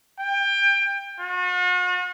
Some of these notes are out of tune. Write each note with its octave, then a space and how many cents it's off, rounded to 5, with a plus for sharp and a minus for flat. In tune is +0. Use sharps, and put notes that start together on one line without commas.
G5 +25
F#4 -45